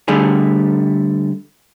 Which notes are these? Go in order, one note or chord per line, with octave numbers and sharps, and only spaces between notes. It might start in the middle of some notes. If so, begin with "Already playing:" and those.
D3 G3 A3 G#4